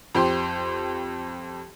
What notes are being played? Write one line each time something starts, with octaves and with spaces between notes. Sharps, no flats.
F2 G4 C6